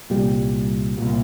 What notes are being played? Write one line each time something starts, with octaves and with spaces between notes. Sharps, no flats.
C2 A#2 G3
C2 A#2